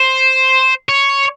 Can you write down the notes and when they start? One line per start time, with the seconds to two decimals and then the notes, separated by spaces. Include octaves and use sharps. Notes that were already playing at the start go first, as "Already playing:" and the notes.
Already playing: C5
0.89 C#5